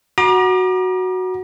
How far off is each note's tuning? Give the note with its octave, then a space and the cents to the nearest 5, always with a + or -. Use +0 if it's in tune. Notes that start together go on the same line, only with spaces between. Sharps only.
F#4 +0 A#5 +40 D6 +40